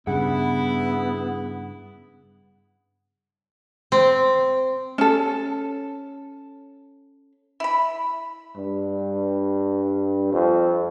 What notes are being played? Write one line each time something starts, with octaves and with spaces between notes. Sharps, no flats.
G2 C#3 B3 E4 G#4 F#5
C4
C#4 A4
E4 B5
G2
F2